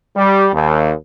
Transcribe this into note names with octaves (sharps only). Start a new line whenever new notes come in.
G3
D#2